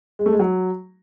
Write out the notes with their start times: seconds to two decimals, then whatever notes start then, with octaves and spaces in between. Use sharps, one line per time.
0.19 G#3
0.26 A3
0.33 G#3
0.39 F#3